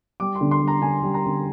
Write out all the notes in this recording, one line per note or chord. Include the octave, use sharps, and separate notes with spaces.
G3 D6
C6
D3
C6
G3
A#5
D3 G#5
G3
A#5
D3